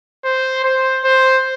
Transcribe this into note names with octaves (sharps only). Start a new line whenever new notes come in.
C5
C5
C5